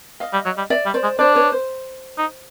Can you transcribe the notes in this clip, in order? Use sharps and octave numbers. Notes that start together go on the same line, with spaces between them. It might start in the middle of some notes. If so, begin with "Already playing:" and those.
D#5 F5
G3
F#3
G3
D5 E5
G3
C5 D5
G#3
D4 C5 D5
B4 C#5
C5
D#4